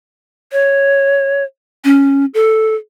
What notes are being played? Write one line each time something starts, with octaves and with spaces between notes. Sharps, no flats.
C#5
C#4
A4